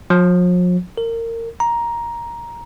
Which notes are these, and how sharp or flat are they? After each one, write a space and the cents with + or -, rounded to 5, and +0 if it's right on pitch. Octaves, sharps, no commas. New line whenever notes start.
F3 +45
A#4 -25
A#5 +10